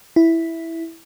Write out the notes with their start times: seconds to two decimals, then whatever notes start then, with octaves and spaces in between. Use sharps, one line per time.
0.16 E4